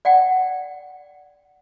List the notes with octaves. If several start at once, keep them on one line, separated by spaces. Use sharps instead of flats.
D5 F#5 G5